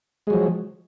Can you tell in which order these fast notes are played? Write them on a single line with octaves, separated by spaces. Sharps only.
G#3 F#3 F3